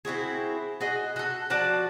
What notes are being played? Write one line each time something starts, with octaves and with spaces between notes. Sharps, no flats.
C4 E4 F#4 G#4
F#4 G#4 D#5
F#4 A4
F3 F#4 D5 A5